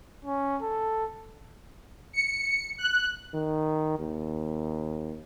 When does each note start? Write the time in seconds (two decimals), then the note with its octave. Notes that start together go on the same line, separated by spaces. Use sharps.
0.25 C#4
0.62 A4
2.13 C#7
2.78 F#6
3.34 D#3
3.99 D#2